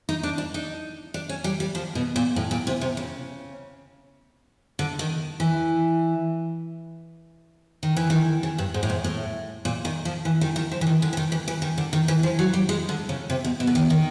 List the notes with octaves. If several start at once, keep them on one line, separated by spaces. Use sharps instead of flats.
D#4
D4
D4
D#4
D4
C#4
G3
G3
F3
B2
A#2
A2
A#2
C3
C3
C#3
D3
D#3
E3
D#3
E3
D#3
C#3
G2
G#2
A2
G#2
A2
A#2
D#3
F3
E3
D#3
D#3
F3
E3
D#3
D3
E3
D#3
E3
E3
D#3
D3
D#3
E3
F3
F#3
G3
G#3
D3
C#3
C3
B2
B2
D3
D#3
D#3